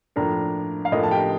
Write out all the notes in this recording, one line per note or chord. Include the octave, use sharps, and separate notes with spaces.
A2 F3 A#3 D4 A#4 A#5
F5
A2 F3 A#3 D4 D#5
A5
G4 G5